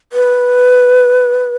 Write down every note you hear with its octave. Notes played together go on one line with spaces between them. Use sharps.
B4